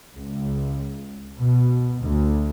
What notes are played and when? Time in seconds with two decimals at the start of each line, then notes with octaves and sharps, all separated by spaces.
0.15 C#2
1.38 B2
2.01 D2